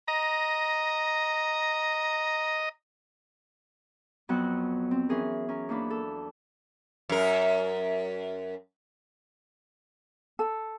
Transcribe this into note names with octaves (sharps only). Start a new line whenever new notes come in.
D#5 A#5
F2 F#3 B3 F#4 F#6
C4
E3 C#4 G#4 A#4
C#4 A#4
E2 A#3 D4 B5
A4
F#2 A#4
A4